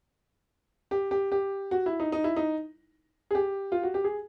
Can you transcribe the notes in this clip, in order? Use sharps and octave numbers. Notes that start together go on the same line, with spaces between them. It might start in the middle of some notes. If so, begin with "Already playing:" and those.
G4
G4
G4
F#4
E4
D#4
D#4
E4
D#4
G#4
G4
F4
F#4
G4
G#4